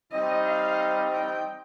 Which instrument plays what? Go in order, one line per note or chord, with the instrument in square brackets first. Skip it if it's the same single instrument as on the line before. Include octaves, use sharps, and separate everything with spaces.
[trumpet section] G3 C4 D#4 [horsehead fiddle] D#5
[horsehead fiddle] F5
G5